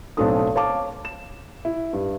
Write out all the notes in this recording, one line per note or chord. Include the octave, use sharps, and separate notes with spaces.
B1 A3 C4 D4 A4 D#6
C#5 F5 A5 D6
E7
E4
G2